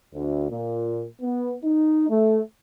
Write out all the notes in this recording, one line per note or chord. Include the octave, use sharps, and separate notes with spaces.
D2
A#2
B3
D#4
A3